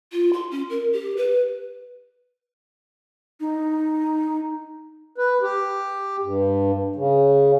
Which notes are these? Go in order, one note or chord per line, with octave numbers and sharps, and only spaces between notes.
F4
C6
C#4
A#4
G4
B4
D#4
B4
G4
G2
C#3